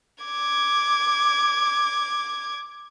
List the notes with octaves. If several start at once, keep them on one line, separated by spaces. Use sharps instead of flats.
D6 G#6